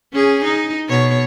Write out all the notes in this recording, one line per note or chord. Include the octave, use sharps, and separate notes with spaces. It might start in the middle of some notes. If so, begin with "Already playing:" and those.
C#4 G#4
D#4
B2 C#5